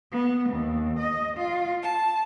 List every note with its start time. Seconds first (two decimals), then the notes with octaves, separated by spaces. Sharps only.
0.11 B3
0.49 D#2
0.99 D#5
1.38 F4
1.82 A5